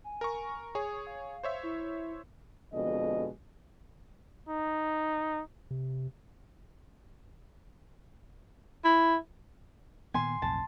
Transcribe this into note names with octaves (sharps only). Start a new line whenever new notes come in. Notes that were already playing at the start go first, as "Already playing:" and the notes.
G#5
A#4 A#5 C#6
G#4 C#5 D#6
F5
C5 C#5 E5
E4
F2 B2 D3 G#3 D#5
D#4
C3
E4
A#2 D#3 B3 G#5 C6
B1 F2 A2 A5